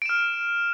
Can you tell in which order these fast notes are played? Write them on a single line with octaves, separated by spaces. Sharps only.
D7 E7 F6